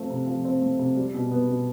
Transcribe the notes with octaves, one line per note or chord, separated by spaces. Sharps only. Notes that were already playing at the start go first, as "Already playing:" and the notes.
Already playing: F3 A3 C4
C3
F3
C4
A3
C3
G3
B2
B3
B2